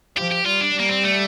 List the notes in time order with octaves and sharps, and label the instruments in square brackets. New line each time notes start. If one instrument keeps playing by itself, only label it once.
[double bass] F3 [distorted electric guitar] G4
[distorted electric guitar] G4
[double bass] G3 [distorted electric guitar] F4
[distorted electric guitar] D4
[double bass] G3
[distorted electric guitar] A#3
C4
A3